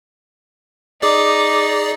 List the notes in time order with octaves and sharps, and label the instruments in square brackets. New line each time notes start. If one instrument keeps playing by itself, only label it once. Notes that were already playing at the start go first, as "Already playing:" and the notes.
[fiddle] D#4 [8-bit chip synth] G#4 D5 [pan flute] D6